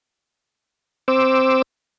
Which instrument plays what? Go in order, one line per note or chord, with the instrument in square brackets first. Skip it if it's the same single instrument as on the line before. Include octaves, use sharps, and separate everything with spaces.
[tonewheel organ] C4 C5 D6 E6